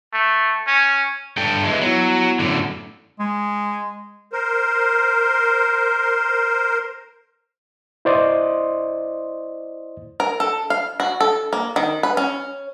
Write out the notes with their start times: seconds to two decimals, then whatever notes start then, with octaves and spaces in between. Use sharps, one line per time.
0.13 A3
0.67 C#4
1.37 G2 A4 G5
1.63 E3 G#3
1.81 F#3 B3 E4
2.39 F#2 A2 D3
3.19 G#3
4.33 A#4 C5
8.05 E4 C5 D5 D#5 C6 D#6
10.20 A#4
10.40 A4
10.70 F5
11.00 F#4
11.21 A4
11.53 A#3
11.76 D#3
12.03 B4
12.17 C#4